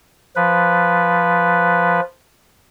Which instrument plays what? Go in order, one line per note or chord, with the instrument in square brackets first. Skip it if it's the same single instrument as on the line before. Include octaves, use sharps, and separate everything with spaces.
[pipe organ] F3 B4